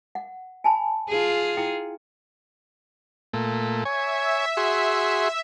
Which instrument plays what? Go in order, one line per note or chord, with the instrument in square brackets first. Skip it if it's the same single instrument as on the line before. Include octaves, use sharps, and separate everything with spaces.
[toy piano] F#5
G#5 A5 B5
[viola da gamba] F4 G#4
[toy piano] E4 G5
[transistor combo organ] A#2 A3
[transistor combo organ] C#5 G#5 [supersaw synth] E5
[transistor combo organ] F#4 G#4 C6